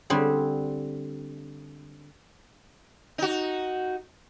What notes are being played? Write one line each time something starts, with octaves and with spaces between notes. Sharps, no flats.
D3 G3 C4 G#4
D#4 F#4